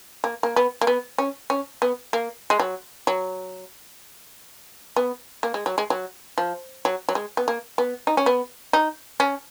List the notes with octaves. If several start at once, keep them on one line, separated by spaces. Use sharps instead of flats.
A#3
A#3
B3
A#3
B3
C#4
C#4
B3
A#3
G#3
F#3
F#3
B3
A#3
G#3
F#3
G#3
F#3
F3
F#3
F#3
G#3
B3
A#3
B3
D#4
C#4
B3
D#4
C#4